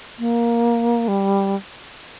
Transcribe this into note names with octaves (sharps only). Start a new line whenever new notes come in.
A#3
G3